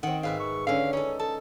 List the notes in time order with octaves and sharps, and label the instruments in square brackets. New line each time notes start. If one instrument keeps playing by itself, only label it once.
[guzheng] D#3 C4 [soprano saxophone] F#5
[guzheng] G#2 B4 E5 [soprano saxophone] F5
[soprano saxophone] C#6
[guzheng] D3 C#4 [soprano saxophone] F5
[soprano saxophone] C#4 [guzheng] D#4 A4
[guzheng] A4 [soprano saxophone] A5